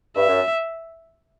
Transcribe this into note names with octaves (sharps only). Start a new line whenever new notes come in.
G2 E5
F#2